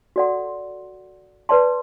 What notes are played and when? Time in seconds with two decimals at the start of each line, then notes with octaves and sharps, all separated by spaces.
0.16 F#4 A4 D5 F#5 C6
1.49 B4 D5 A5 C6